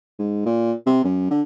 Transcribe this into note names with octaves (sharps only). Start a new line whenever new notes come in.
G#2
A#2
C3
F#2
D3